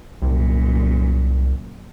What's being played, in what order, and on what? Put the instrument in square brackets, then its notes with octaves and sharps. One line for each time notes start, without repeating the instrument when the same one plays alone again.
[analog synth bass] C2 [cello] F#2 A#2